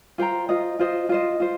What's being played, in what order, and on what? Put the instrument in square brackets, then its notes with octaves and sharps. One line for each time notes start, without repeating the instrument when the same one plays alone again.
[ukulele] F4 C5 G5 A#5
F4 C5 D#5
F4 C5 D#5
F4 C5 D#5
F4 C5